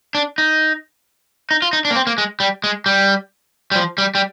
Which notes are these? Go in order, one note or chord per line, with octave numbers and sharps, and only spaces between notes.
D4
D#4
D#4
F4
D#4
D4
A#3
C4
A#3
G#3
G3
G#3
G3
G3
F3
G3
G3